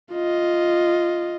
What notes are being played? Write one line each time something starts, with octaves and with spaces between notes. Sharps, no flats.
F4 D#5